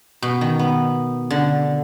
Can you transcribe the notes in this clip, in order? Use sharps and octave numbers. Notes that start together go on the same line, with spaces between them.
B2
D#3
B3
D3